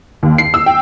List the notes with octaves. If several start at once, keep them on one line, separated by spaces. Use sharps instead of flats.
D#2
C7
E6
G5